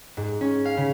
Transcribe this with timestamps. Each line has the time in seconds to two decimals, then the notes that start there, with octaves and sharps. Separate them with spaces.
0.17 G#2
0.41 C#4
0.65 F5
0.77 C#3